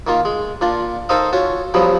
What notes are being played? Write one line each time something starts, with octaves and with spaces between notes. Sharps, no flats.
D#3 A#3 F4
G#3
A#2 D4 F4
D#4 A4 A#4 C5 D#5 F5
C#4 F4 F#4
G2 F3 F#3 B3